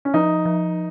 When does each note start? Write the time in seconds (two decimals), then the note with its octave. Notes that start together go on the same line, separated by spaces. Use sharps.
0.05 C#4
0.14 F3 D#4
0.45 F3